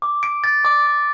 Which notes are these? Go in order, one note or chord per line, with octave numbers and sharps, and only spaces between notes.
D6
D7
A6
D6
D6